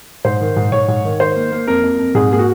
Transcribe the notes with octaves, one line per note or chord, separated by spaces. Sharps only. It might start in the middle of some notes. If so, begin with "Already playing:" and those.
G#2 C5
D#3
G#2
G#2 C#5
G#2
D#3
D#3 C5
A#3
A#3
F2 A#4
F2
F2
G#2 G#4
A#3 G#4
F#4